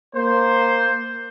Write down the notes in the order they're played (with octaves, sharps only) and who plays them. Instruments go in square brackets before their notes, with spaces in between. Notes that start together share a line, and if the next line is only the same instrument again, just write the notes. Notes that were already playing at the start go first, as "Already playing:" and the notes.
[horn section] A#3 C5